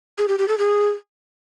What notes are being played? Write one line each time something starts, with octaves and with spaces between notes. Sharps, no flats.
G#4
G4
G4
A4
G#4